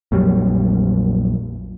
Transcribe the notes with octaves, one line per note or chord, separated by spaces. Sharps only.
A#1 F2 F#3 G3